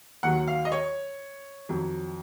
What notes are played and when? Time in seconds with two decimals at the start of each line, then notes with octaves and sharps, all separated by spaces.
0.23 D#2 D#3 F#3 F#5
0.48 F5
0.65 D#5
0.72 C#5
1.69 F2 D#3 F#3